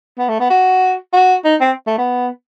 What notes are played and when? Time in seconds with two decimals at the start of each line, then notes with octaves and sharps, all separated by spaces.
0.19 B3
0.29 A3
0.40 B3
0.50 F#4
1.13 F#4
1.44 D#4
1.61 C4
1.87 A3
1.98 B3